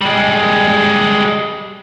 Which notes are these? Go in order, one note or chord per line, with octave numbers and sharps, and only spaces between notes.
G3 G#3